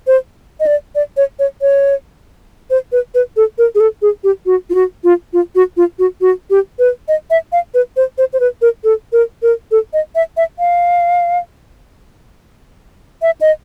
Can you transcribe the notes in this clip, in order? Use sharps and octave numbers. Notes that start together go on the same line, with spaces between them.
C5
D#5
D5
D5
C#5
C#5
C#5
C5
B4
B4
A4
A#4
G#4
A4
G#4
G4
F#4
F4
F#4
F4
F4
F#4
F4
F#4
F#4
G4
B4
D#5
E5
F5
B4
C5
C5
C5
B4
A#4
A4
A#4
A#4
A4
D#5
E5
E5
F5
E5
D#5